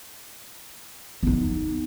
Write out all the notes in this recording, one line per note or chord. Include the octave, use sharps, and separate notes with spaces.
B3 D#4